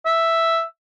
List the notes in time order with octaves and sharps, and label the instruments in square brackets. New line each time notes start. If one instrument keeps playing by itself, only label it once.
[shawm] E5